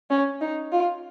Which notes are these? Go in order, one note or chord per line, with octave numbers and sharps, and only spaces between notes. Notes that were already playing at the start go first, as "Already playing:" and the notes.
C#4
D#4
F4